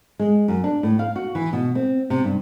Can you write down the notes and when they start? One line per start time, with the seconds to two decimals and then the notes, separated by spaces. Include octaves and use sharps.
0.19 G#3
0.48 F#2
0.64 D4
0.83 A2
0.99 F5
1.16 F#4
1.35 E3
1.53 B2
1.75 C4
2.10 C3
2.24 G2